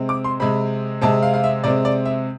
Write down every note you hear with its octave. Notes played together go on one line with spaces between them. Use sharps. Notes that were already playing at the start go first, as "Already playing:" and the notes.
Already playing: C3 G#3 C4
D6
C6
C3 G#3 C4 B5
C3 G#3 C4 A5
F5
F5
E5
C3 G#3 C4 D5
D5
E5